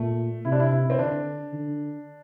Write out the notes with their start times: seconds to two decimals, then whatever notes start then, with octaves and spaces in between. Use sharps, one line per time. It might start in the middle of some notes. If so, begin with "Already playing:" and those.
Already playing: A#2 A3
0.45 C3 E4
0.52 D4
0.60 E4
0.72 E4
0.90 C4
0.99 D3 D4
1.53 D3